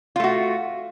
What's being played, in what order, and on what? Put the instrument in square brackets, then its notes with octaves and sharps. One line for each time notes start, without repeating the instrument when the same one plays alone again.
[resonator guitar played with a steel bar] F4
A3
F#4